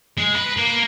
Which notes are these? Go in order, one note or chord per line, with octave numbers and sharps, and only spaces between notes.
G#3
B4
A#3